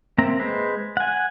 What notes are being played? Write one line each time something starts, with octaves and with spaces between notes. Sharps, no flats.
A#3 C4 E5 A#5
G#3 B4 C5
F#5 G#5